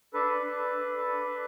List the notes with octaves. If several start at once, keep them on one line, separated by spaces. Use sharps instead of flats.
D4 A4 B4
D4
A4
D4
A4
D4